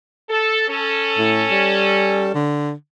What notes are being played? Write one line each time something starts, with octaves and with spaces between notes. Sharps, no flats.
A4
C#4 A4
A2
G3
D3